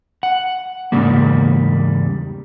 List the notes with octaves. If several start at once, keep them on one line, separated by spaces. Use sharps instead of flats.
F#5
E2 G#2 C#3 G3 A#3